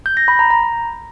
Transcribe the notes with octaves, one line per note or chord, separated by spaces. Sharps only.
G6
A#6
B5
A#5
A#5